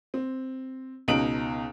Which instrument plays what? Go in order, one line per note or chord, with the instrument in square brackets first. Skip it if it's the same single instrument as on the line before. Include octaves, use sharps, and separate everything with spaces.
[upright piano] C4
C#2 B2 D#4 D7 F#7